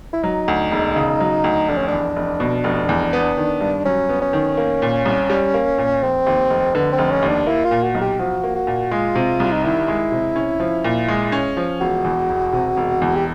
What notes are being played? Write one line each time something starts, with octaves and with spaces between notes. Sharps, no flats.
E4
F#3 D#4
D2
E1
C#3
F#3
D2
F1 D4
C#4
E2 D4
F1
B2
F1
E2
B3
D#3
G2
F#3 C#4
B3
C#4
D#3
A#3
A#2
C2
G3
A#3
A#2
F1 C4
D#2
F1
D3 B3
C4
F1
C#4
D#2
D4
A#3 E4
F4
A#2
F#4
B1
G4
F3 F#4
A#3
F#4
A#2
G#3 F4
C3
C2
D#4
D#3 E4
G#3
C3
C#4
F3
A#2
G#3
C#4
F3
E1 F#4
E2
E1
C3
E1
E2
G4